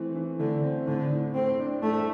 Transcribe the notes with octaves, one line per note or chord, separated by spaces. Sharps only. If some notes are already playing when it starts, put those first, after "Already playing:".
Already playing: E3 A3 C4
E3
D3 A3
C4
A2 D3
A2
A3 C4
D4
A2 A3